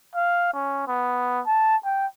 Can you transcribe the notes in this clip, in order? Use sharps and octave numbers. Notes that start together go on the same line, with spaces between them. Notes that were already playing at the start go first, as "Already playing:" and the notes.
F5
C#4
B3
A5
G5